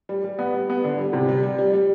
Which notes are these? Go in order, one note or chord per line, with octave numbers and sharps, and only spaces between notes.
G3
G3
B3
G3
B3
D3
G3
C3
G3
G3
G3
G3